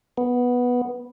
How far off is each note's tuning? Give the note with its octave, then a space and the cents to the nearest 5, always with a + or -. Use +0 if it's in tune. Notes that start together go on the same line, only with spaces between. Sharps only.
B3 -5